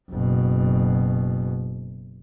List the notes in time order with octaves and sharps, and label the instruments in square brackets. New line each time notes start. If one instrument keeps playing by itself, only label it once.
[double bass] F#1 B2